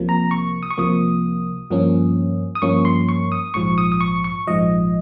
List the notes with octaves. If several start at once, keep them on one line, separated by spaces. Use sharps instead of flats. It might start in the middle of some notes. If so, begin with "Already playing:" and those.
Already playing: C2 C3 F3 A#3
A#5
C#6
D#6
C#6
C2 C3 F3 A#3 D#6
G2 F3 A#3 C#4
D#6
G2 F3 A#3 C#4 C#6
C6
C#6
D#6
A#1 G#2 F3 C#6
D#6
D#6
C#6
C#6
A#1 G#2 F3 D#5